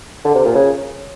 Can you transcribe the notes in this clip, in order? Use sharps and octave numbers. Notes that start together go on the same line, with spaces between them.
D3
C3
A#2
C#3